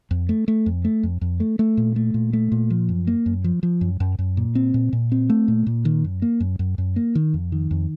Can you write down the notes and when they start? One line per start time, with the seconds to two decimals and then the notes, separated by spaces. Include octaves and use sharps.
0.11 F2
0.29 A3
0.48 A3
0.66 F2
0.85 A3
1.03 F2
1.21 F2
1.40 A3
1.59 A3
1.77 A#2
1.96 A3
2.14 A#2
2.33 A3
2.52 A#2
2.70 F3
2.89 F#2
3.07 A#3
3.26 F#2
3.44 F3
3.63 F3
3.81 F#2
4.00 F#2
4.19 F#2
4.37 A#2
4.55 C4
4.74 A#2
4.93 A#2
5.12 C4
5.30 A3
5.48 A#2
5.67 A#2
5.85 D#3
6.04 F#2
6.22 A#3
6.40 F#2
6.59 F#2
6.78 F#2
6.96 A#3
7.15 D#3
7.34 F2
7.52 D#3
7.71 F2